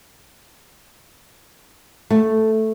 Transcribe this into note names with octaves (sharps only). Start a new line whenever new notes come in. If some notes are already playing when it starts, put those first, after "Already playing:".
A3